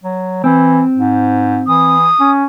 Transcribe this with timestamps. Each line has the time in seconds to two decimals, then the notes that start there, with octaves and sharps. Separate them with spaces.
0.04 F#3
0.44 E3 C4
0.98 G#2
1.67 E3 D#6
2.20 C#4